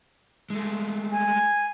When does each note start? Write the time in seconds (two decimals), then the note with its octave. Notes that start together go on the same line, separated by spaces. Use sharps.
0.50 G#3 A3
1.12 G#5